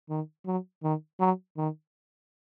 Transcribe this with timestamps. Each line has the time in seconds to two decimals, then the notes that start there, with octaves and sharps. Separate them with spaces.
0.10 D#3
0.46 F#3
0.83 D#3
1.20 F#3
1.57 D#3